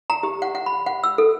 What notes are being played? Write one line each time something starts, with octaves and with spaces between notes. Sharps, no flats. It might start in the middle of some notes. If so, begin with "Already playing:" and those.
A#5
G4
F#5
F#5
B5
F#5
E6
A4